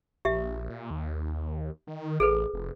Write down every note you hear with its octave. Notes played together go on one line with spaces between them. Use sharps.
A#1 G4 E5
A#2
D#2
D#3
A1 G#4 A4 B4
F1